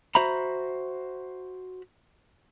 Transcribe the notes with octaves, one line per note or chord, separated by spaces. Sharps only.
F#4 C5 E5 A#5 B5